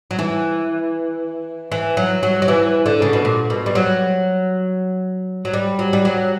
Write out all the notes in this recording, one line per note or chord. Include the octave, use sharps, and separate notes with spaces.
F#3
E3
E3
F#3
F#3
F#3
E3
D3
C#3
B2
A#2
B2
G3
F#3
F#3
G3
F#3
G3
F#3